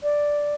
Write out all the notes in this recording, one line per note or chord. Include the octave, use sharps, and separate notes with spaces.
D5